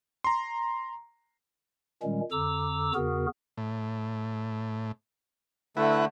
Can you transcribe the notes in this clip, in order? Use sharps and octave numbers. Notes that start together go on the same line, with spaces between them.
A#5 C6
A#2 D#3 G3 G#3 C#4
F2 D3 A4 A#5 D6 E6
E2 C#3 B3 F#4 G#4 A#4
A2
D3 A3 E4 B4 F#5